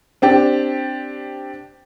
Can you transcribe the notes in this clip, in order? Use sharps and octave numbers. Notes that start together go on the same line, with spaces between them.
C4 D4 G4